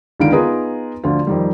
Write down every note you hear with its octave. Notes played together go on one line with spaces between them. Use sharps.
C#2 D3 D#3 F5 D7
B3 D#4 F4 G#4 B4 A#5
D2 D3 F3 F4
F2 D#3 G3